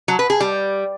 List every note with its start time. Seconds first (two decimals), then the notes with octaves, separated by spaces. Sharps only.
0.08 F#3
0.19 B4
0.30 G#4
0.40 G3